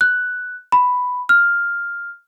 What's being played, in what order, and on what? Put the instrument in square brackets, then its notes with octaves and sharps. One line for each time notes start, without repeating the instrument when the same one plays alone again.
[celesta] F#6
B5
F6